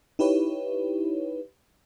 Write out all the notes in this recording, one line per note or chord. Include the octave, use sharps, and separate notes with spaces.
D#4 E4 G4 B4 C#5